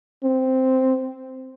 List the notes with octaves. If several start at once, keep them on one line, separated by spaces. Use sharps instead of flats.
C4